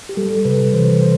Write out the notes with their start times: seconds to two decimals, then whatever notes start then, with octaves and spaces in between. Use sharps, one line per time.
0.09 G4
0.17 G3 A4
0.45 C3 B4
0.74 E3 C5
1.02 C5